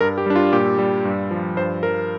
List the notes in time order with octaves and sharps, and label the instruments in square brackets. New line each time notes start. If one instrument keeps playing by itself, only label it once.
[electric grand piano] G2 A#4
G4
G3 D4
F4
A#2 G4
G3
G2
F3
G2 C5
F3 A#4